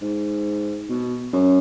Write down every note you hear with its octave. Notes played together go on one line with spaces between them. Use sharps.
G#2
B2
F#2